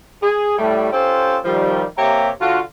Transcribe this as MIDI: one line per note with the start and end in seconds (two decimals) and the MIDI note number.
0.23 0.56 68
0.58 0.90 45
0.58 0.90 55
0.58 0.90 57
0.93 1.37 61
0.93 1.37 65
0.93 1.37 67
0.93 1.37 69
0.93 1.37 72
1.44 1.85 51
1.44 1.85 53
1.44 1.85 55
1.98 2.30 48
1.98 2.30 58
1.98 2.30 67
1.98 2.30 73
1.98 2.30 76
1.98 2.30 82
2.40 2.61 50
2.40 2.61 65
2.40 2.61 66